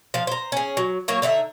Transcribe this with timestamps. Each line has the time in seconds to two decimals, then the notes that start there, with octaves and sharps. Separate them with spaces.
0.14 F3 F5
0.27 C5 A#5
0.52 C#4 G#4
0.77 F#3
1.08 F#3 A#3 C#5
1.22 D3 D#4 G4 E5